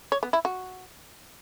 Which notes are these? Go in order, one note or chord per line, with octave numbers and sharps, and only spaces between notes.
C#5
B3
E4
F#4